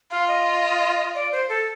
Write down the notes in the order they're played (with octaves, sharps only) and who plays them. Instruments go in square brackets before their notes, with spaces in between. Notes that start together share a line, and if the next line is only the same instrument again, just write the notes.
[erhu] F4 [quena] F5
[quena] D#5
D5
C5
A4